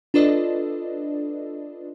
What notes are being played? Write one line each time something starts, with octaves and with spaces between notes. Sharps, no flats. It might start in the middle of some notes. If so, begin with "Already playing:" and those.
D4 F4 A4 B4 D5 D#5